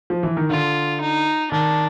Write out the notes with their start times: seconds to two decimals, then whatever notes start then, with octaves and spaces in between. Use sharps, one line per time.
0.10 F3
0.23 E3
0.37 D#3
0.50 D3 F4
1.01 D#4
1.52 D#3 D4